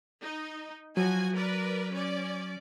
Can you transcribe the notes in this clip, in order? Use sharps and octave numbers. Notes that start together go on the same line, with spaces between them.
D#4
F3 F#3 F#4 G#5
A#4 B4 D5
C#4 D5